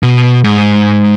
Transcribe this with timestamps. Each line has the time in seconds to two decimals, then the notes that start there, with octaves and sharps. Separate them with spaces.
0.03 B2
0.44 G#2